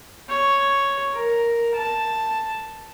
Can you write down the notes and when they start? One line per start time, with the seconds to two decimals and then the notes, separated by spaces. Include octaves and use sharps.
0.29 C#5
1.13 A#4
1.75 A5